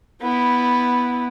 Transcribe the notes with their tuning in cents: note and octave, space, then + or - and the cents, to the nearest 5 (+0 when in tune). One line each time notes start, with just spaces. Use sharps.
B3 +0 E4 -10